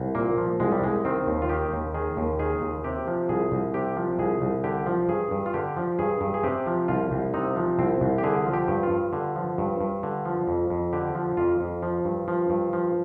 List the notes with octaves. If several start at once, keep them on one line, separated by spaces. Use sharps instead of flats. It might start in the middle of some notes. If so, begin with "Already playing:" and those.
Already playing: C2
A#2 A#3
F3
C2 G#3
G3
C2 G#3
D#3 C4
D#2
F4
D#3 G4
D#2
D#3 G#4
D#2
D#3 G#4
D#2
C3 G4
F3
C2 G#4
C2
C3 G4
F3
C2 G#4
C2
D3 G4
F3
G2 G#4
G2
F4
D3 G4
F3
G2 G#4
G2
G#4
C3 G4
F3
C2 F4
C2
C3 D#4
F3
C2 C4
C2
G4
D3 G#4
F3
G4
G2
F4
G2
D3
F3
G2
G2
D3
F3
F2
F2
D3 G4
F3
F2 F4
F2
F3
G2
F3
G2
F3